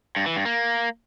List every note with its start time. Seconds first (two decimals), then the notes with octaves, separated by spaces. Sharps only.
0.16 G2
0.26 E3
0.36 G2
0.45 A#3